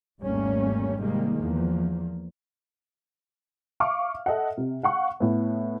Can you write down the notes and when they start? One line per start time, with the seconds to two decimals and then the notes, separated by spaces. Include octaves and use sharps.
0.20 G#1 E2 G3 A3 A#3 C#4
1.01 C3 D#3 G3 G#3 A#3
1.36 E2 F3 A#3
3.80 E5 F5 C#6 D6 F6
4.26 A4 D#5 E5 F#5
4.58 C3
4.83 F5 F#5 C#6
5.20 A2 B3